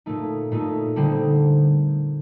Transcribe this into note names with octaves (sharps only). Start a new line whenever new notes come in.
A#2 A3 D#4
A#2 A3 D#4
D3 G3 C4 D#4